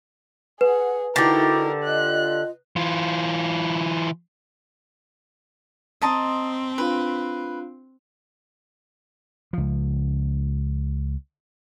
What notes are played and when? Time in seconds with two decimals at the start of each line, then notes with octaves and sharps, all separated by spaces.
0.61 G#4 B4 F#5
1.16 D3 D#4 E4 F#4 G4 A#4
1.84 F4 D#5 F#6
2.76 E3 F4
6.02 C4 D#5 A5 A#5 C6 D#6
6.78 D4 F4 B4 F5
9.53 C#2 F3